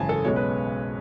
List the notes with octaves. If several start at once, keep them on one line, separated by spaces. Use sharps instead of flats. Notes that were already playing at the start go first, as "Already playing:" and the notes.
Already playing: G#1 F#2 C#3 E3 G#5 A5
A4
B1 B2 G#3 C#4 C#5
B4